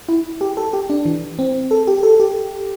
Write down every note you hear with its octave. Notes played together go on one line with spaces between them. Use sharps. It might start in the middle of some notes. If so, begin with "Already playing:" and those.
E4
G4
A4
G4
D4
E3
C4
A4
G4
A4
G4